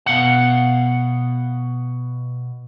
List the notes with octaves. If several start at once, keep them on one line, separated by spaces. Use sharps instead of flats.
B2 F5 F#5